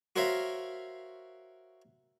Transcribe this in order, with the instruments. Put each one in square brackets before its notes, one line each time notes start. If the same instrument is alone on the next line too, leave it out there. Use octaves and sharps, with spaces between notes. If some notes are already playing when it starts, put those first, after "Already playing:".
[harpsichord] F#4 A#4 C5 C#5 E5 F5